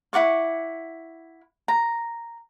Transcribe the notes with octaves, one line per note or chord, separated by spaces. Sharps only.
E4 F#5 C#6 D6
A#5